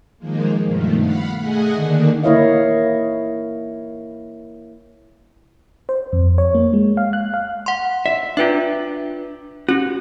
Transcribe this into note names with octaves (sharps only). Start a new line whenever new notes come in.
D#3 F3 G#3 A#3
G2 B2 D#3 F3 A3
F5 F#5 B5
A3 G#4 D#5 F#5 G#5
D3 D#3 A#3 D4
A#3 E4 C#5 D#5 F5
C5
F2
C#5
A#3
G#3
F5
F#6
F5
F#5 C6
E5
D4 F4 B4 E5 G5
C#4 F#4 G4